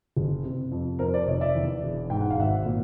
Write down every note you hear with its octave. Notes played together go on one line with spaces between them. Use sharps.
F#1
C3
F2
F2 A#4 C5
C5 D5
F1 C#5 D#5
D5 E5
E2
E1
G#2 G5
F#5
F5
G#1 E5 F#5
A#2